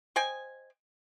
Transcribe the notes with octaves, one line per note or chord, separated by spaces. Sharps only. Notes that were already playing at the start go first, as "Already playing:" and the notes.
C5 D#5 G5 G#5